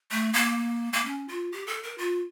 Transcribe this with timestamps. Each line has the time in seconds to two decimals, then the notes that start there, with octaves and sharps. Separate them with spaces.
0.11 A3
0.33 A#3
0.93 A#3
1.05 C#4
1.28 F4
1.52 G4
1.67 A4
1.83 A#4
1.98 F4